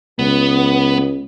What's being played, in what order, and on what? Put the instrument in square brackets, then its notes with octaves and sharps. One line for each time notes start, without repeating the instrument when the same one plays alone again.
[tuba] C#2 [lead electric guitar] B3